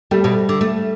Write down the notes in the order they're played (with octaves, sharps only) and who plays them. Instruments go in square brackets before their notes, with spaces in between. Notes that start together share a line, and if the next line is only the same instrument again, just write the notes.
[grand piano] G3 [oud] A3
[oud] B2
D3
A3